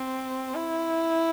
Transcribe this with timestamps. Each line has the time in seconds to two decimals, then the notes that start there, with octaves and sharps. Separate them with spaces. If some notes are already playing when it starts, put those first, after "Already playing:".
Already playing: C4
0.55 E4